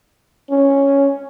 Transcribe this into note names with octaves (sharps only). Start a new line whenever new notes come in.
C#4